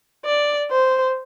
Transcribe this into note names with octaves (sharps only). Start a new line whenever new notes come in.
D5
C5